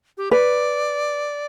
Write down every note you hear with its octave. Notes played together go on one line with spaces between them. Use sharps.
G4
B4 D5